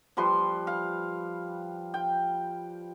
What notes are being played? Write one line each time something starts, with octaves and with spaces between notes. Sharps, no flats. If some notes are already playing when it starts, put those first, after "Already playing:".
F3 G3 B4 C6
F5
G5